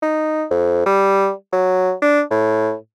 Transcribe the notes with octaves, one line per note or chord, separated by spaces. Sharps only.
D#4
F2
G3
F#3
D4
A2